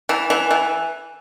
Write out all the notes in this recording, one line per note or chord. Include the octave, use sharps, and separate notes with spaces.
E3
E3
E3